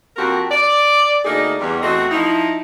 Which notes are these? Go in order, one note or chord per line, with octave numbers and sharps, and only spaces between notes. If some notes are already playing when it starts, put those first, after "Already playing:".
F2 A#3 C4 F#4 G4 A#4
D5
D2 A3 A#3 D#4 G#4 D5
E2 G3
E2 A3 C4 F#4 D#5
F3 D#4 E4